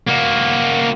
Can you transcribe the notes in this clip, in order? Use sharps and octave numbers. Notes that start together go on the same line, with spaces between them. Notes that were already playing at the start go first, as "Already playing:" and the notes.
A#3 F#4